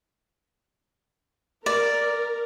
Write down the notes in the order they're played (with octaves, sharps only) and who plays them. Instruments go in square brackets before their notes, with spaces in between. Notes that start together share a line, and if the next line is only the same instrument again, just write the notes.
[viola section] A#4 [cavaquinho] D5